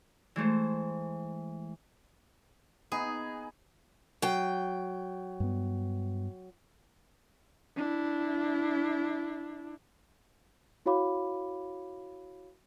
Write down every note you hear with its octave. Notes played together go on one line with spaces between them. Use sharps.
E3 G#3 A3 C5
B3 D#4 G#4
F#3 G5
G2 B3
D4 E4
E4 F#4 C#5 F5 B5 D6